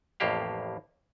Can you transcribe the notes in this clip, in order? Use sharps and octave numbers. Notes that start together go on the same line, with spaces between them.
A1 F2 A2 A#3 G4 F5